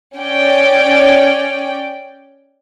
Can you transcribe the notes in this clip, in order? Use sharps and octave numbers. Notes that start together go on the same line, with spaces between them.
C#4 D5 G5